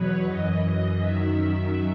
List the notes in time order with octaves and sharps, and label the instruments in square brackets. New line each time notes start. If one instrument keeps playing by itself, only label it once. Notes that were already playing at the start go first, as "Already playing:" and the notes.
Already playing: [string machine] E2 B2 F#3 B4 C#5
F#2 E3 D#5
F#2 D#3 F#3 E5